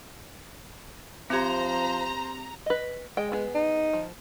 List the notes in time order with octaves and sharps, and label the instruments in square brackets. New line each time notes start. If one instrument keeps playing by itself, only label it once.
[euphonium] F3 [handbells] C4 G4 [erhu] C5 [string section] A#5
[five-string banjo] B4 D#5
[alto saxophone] G#3 [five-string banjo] D#5 G5
[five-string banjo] B3 G#4
[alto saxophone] D#4
[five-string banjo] F3